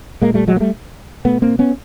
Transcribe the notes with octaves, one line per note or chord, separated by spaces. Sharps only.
A#2 G#3 A#3
G3 A3
F#3 G#3
A#3
G3 A3
B2 A3 B3
A#3 C4
B3 C#4